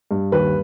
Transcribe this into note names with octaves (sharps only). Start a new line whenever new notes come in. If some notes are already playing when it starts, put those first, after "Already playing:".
G2
D#2 B4